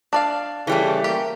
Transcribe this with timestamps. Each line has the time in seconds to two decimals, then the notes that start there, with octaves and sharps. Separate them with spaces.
0.13 D4 D5 F5
0.67 C#3 E3 G3 A3
1.04 A#3 G4